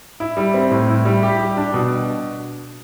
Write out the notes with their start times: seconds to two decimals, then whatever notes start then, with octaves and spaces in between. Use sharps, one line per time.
0.20 E4
0.37 G3
0.54 C4
0.71 A2
0.88 E4
1.05 G3
1.23 G4
1.39 G3
1.57 D4
1.74 B2